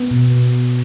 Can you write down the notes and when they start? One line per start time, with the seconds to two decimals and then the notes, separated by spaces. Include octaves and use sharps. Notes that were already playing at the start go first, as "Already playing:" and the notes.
Already playing: B3
0.11 B2